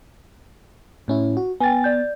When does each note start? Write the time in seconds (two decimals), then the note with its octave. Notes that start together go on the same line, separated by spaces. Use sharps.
1.08 A2 C#4 E4
1.37 F#4
1.60 B3 G5 G#5 A6
1.84 D5 G6